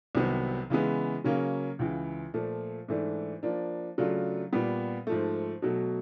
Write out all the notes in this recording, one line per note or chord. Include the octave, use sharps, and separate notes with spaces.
C2 C3 D#3 F#3 B3
C#3 E3 G#3 B3
C#3 F#3 A#3 C#4
C#2 C#3 E3
A#2 F3 A3
G#2 E3 A3 D4
F3 A#3 D4
C#3 F#3 A3 D4 F4
A#2 G3 B3
G#2 F3 A3
B2 F#3 A3